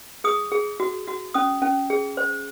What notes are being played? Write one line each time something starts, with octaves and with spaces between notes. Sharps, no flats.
G#4 D#6
G#4
F#4
F#4
C#4 D#6
C#4
G#4
C5